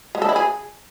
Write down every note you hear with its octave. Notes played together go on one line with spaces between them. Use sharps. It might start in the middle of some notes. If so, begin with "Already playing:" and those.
G#3
A4
E4
G#4